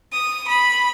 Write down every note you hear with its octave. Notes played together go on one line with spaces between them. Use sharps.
D#6
B5